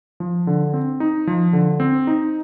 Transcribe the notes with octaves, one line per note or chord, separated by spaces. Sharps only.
F3
D3
C4
D#4
F3
D3
C4
D#4